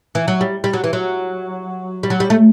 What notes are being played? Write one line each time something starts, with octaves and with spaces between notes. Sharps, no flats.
E3
F#3
G3
G3
F#3
E3
F#3
G3
F#3
G3
A3